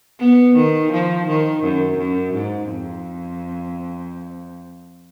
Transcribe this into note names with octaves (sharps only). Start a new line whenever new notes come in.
B3
D#3
F3
D#3
F#2
F#2
G#2
F2